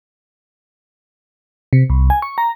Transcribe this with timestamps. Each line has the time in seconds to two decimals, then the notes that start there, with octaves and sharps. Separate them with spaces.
1.73 C3
1.90 C2
2.10 G#5
2.22 C#6
2.38 A#5